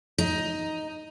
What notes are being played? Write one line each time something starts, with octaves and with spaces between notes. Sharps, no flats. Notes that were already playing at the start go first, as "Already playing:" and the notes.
D#4